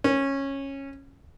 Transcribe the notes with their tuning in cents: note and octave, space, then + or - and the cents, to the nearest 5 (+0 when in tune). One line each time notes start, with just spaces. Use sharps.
C#4 -15